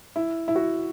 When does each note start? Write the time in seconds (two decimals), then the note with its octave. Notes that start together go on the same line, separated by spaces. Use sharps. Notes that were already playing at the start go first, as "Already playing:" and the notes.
0.16 E4
0.48 E4
0.56 F#4